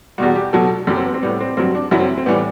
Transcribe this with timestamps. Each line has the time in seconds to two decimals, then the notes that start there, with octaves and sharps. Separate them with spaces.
0.18 E2 B2 G3 F#4
0.36 G4
0.53 B2 F#3 A4
0.87 F#2 F#3 G4
0.97 C4
1.06 B3
1.14 C4
1.23 A2 G3 B3
1.40 C4
1.57 G2 F#3 C4
1.75 D4
1.91 F#2 F#3 E4
2.00 C4
2.18 C4
2.26 A2 E3 G3 B3